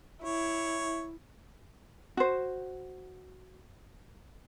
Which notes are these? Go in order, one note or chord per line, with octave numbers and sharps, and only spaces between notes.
E4 C#5
F#4 C5